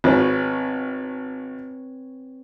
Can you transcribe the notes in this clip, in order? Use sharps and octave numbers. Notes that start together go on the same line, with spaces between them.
G#1 F3 C4 B4 C#5